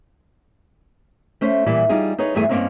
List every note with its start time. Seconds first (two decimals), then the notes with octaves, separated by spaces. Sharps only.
1.41 A3 C#4 C5
1.66 A#2 E3 G3 G4
1.89 G3 D#4 F4 G#4
2.18 D#4 G#4 B4 C#5
2.35 E2 G2 E3 A3 G#4 G#5
2.49 G2 C3 A#3 C4 C#4 D#4